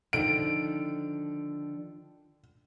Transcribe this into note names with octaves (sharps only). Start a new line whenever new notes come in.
D3 D#3 F3 D7